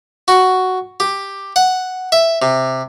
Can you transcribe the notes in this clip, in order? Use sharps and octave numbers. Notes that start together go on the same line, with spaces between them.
F#4
G4
F#5
E5
C3